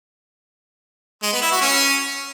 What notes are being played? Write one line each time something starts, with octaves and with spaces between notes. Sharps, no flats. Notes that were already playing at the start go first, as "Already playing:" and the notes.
G#3
B3
E4
F#4
C#4